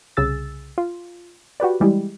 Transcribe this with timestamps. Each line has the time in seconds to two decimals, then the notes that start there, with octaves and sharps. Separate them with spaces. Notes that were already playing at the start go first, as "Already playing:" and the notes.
0.17 C2 C#3 G#4 E6 A6
0.78 F4
1.60 F#4 G4 B4 D5
1.80 E3 G3 G#3 E4 G4